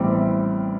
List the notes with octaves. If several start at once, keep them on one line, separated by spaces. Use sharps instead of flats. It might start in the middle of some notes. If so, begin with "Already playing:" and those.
Already playing: A1 A2 G3 C4 D6